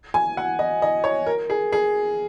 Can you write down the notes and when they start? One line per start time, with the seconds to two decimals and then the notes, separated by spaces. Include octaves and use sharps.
0.14 G#5
0.37 F#5
0.59 D#5
0.82 D#5
1.04 C#5
1.27 A#4
1.50 G#4
1.72 G#4